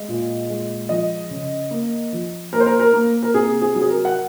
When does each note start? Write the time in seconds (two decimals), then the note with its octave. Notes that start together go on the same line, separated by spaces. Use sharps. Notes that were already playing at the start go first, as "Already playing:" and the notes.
Already playing: G#3 D#5
0.08 A#2
0.49 G#3
0.89 F3 D#5
1.30 C#3
1.71 A#3
2.12 F3
2.53 A#3 A#4
2.60 C5
2.66 A#4
2.80 A#4
2.93 A#3
3.23 A#4
3.34 C3 G#4
3.62 G#4
3.75 F#3
3.81 G#4
3.88 A#4
4.05 F#5